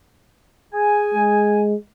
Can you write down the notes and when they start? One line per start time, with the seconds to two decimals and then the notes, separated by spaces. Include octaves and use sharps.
0.73 G#4 G#5
1.14 G#3